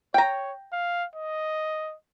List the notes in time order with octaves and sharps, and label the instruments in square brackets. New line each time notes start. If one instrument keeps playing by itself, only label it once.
[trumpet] C#5 [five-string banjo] G5 A#5
[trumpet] F5
D#5